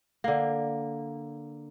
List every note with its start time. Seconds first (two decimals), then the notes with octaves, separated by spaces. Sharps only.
0.24 D3 A#3